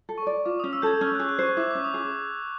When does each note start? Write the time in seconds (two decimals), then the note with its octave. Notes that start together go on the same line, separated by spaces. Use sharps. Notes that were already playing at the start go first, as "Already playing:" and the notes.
0.09 A4
0.18 C#6
0.27 D5
0.45 F4 D6
0.60 D#6
0.64 C#4
0.73 E6
0.82 A4 G6 G#6
1.01 C#4 G#6
1.15 F#6
1.20 G#4
1.29 F#6
1.39 C5 C#6
1.57 E4 D6
1.71 D6
1.75 C#4
1.84 D#6
1.94 G#4 D6